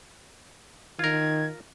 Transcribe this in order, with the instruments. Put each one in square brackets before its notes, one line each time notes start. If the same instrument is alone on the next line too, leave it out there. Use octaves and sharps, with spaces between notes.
[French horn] D#3 [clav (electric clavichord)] F4 A#4 [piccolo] G#6